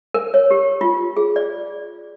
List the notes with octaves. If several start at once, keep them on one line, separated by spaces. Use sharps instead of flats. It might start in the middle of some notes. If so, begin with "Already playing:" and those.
A#4
C#5
G4
F4
G#4
D5